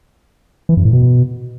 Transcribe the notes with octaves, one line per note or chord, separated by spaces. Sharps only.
E3
F#2
A2
B2